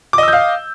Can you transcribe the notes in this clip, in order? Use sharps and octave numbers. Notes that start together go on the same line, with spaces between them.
D#5 F5 D6 E6 G6